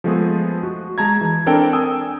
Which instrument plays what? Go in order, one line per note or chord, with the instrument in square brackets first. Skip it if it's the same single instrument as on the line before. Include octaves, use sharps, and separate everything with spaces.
[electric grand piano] F3 G#3 A3 B3 G#4
F#4
G#3 A5 A#5 G#6
E3
C4 D4 A4 A#4 D5 G5
G5 G#5 D#6 E6